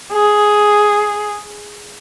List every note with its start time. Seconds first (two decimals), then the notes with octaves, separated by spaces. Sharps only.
0.12 G#4